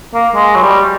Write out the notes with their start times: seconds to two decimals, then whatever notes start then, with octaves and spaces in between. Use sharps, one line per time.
0.14 A#3
0.35 G#3
0.55 F#3
0.63 G3